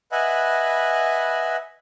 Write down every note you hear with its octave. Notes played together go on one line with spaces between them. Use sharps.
B4 D#5 E5 F#5 G#5 B5